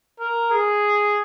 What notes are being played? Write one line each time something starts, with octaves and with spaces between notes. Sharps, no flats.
A#4
G#4